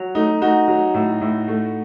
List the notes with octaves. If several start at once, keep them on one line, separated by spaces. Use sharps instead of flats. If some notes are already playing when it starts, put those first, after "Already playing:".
Already playing: F#3
A3 D#4
A3 D#4 F#4
F#3
A2
A2
A3